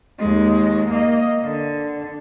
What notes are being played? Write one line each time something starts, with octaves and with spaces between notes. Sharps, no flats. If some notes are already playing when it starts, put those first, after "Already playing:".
D#2 G#3
A#3 D#5
D3